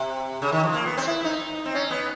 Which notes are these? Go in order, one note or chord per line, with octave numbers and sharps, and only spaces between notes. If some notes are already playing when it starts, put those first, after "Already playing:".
Already playing: C3
C#3
D#3
F3
A#3
B3
C4
E4
D#4
C4
C#4
B3